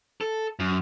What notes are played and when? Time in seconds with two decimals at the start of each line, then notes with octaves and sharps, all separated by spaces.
0.21 A4
0.59 F#2